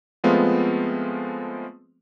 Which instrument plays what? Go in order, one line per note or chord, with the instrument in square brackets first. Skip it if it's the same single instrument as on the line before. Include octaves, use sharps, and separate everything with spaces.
[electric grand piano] F3 G#3 A3 B3 C4 F4